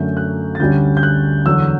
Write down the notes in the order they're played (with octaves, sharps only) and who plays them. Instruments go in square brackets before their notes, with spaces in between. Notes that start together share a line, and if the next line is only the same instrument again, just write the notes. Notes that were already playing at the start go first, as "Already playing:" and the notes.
Already playing: [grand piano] F#2 D3 A3 C#4 G6
F#6
A6
D2 D3 G3 C#4 G6
G6
F#6
E2 D3 F#3 E6